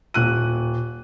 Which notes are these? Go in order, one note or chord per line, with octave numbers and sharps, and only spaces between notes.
D#1 F#6 D#7